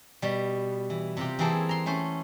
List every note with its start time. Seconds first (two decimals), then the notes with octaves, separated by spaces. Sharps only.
0.22 B2 G3
0.90 E3
1.17 C3 F4 G4
1.39 E3 A#3 C4 G#4 A4
1.69 A#5 C6
1.86 A3 C#4 C5